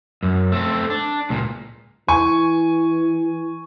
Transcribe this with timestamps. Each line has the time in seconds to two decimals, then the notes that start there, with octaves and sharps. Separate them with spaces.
0.23 F#2
0.52 A3 C4
0.90 D4
1.30 C#2 A#2
2.08 E3 G#5 C#6